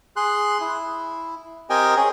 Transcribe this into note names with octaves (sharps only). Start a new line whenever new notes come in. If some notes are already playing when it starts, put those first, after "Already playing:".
G#4 C6 F#6
E4
C4 G4 A#4 D#5 G5 G#5
C#4 G#4